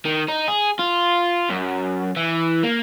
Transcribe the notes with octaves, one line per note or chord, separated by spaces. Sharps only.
D#3
D#4
G#4
F4
F#2
E3
A#3